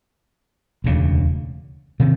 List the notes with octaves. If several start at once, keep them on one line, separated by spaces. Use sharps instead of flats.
E1 D2 C#3
C3 D#3